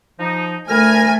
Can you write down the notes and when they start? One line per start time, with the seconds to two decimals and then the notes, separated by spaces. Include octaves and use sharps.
0.20 F3 D#4
0.69 D2 A3 A#4 G#5 B5 F6 A#6